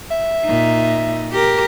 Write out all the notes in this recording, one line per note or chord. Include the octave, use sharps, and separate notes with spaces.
E5
A#2 D#4
G4 A#4